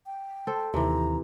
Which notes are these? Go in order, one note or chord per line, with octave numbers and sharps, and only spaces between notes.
G5
A4 C5
D#2 C3 E3 A#5